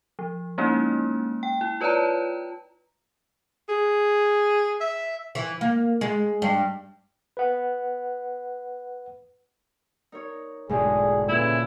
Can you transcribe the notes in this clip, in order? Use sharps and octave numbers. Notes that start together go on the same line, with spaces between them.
F3
G#3 A#3 C#4 D#4 E4
G5
E4
F4 B4 C#5 D5 A5 A#5
G#4
E5
E3
A#3
G#3
G2
B4 F#5
D#4 A#4 C#5
E1 D2 G#2 G#3 G4 G#4 D5
A#2 C#3 E3 E4 A4 F#6